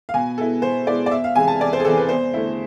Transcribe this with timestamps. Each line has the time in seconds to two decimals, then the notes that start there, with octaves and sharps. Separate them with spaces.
0.09 F5
0.14 B2 G#5
0.38 G#3 B3 E4 A4
0.62 B2 C5
0.87 G#3 B3 E4 D5
1.06 D5
1.11 E2 E5
1.24 F5
1.36 C3 E3 G#3 G#5
1.48 A5
1.60 E2 D5
1.73 C5
1.80 G#4
1.85 C3 E3 G#3 A4
1.98 B4
2.09 E2 C5
2.34 D3 A3 E4